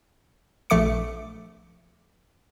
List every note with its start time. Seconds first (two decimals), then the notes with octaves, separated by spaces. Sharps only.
0.70 A#1 A3 D6 C#7